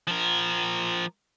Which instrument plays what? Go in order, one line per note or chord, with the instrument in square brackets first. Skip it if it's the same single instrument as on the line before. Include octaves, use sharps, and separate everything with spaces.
[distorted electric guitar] F3 A#4